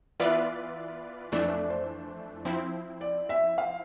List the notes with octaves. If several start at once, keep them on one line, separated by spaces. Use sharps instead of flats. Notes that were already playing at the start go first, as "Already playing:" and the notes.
E3 B3 F4 B4 D5 E5
F2 E3 A3 D4 D5
D5
D5
C5
F3 C4 E4
D5
E5
F5